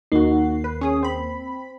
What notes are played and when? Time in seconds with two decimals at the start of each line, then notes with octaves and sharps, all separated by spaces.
0.12 D#2 A#3 D#4 F#4 C7
0.64 B4
0.81 C#4 G#4 D#6
1.03 C4 B5